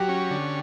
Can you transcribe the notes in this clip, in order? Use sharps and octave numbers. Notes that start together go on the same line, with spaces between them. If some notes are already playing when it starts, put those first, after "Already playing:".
Already playing: F#3 F#4 G4
C#4
D3